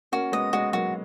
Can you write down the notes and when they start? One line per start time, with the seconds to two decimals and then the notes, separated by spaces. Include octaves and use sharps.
0.12 A#3 C#4 F#4
0.32 G#3 B3 D#5
0.53 G#3 B3 F#4
0.73 F#3 A#3 F#4